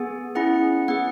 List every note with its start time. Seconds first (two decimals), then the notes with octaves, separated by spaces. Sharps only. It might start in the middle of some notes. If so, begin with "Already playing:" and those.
Already playing: B3 G#4 G#5
0.35 C#4 E4 G#4 F#5
0.88 B3 G#4 F#5